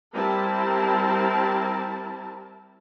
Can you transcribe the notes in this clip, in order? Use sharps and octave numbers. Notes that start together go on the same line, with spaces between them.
G3 C4 E4 A#4 A5